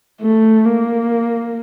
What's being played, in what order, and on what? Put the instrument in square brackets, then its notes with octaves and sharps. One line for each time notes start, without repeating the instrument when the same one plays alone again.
[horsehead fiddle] A3
A#3